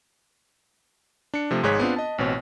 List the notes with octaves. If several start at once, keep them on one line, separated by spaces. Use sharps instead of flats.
D4 C#7
C3 F3 A3
G#1 G#2 G#4 C#5 F#6 B6
B3 C4 D4 F4
D#5 A5
A1 B2 C4 C#5